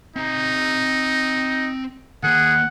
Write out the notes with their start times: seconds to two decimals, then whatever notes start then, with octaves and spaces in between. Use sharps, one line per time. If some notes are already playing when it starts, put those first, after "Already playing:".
0.16 C4 D#4 A#5
2.23 D#3 A#3 G#4 F#5